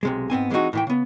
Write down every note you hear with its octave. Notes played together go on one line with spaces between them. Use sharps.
B1 C3 G#3
G#2 B3 C4 G#5
E3 G#3 C4 D4 D#4 F#4
A2 E3 G5
C#3 B3